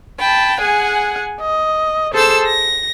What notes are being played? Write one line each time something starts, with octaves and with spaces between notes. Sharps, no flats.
G5 A5 B5
G#4 F#5 G#5
D#5
G#4 A4 C5 A5 E6
A#6